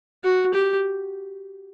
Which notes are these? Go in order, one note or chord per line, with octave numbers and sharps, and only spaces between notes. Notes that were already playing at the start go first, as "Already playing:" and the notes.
F#4
G4